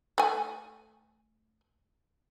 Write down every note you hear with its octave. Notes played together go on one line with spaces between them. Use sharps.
A3 G#5